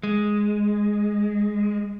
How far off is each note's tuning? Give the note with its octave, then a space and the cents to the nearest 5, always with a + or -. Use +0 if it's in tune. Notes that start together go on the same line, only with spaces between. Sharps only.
G#3 +0